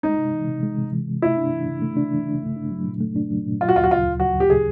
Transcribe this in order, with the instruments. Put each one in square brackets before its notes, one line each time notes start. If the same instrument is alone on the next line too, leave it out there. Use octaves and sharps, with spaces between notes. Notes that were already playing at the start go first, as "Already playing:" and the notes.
[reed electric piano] G#3 [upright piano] D#4
[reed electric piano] C3
E3
C3
G#3
C3
E3
C3
[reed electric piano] A3 [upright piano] E4
[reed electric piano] D4
E3
C#3
A3
D4
E3
C#3
A3
D4
F#3
A#2
A3
D4
F#3
A#2
[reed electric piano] F#3 [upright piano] F4
[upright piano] F#4
[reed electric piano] D2 [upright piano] F4
[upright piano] F#4
[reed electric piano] C#3 [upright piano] F4
[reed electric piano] D2
[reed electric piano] F#3 [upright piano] F#4
[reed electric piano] D2
[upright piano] G4
[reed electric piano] C#3 [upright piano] G#4